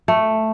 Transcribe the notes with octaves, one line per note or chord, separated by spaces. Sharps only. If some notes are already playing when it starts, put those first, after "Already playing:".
A3